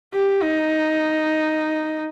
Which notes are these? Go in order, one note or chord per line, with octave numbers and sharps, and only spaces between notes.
G4
D#4